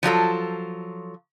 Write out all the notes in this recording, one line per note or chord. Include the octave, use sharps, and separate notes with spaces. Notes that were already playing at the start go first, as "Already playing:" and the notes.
F3 F#3 F4 A4